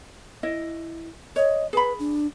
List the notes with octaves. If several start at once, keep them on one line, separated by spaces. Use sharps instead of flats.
E4 D#5
C#5 D#5
G#4 B4 B5
D4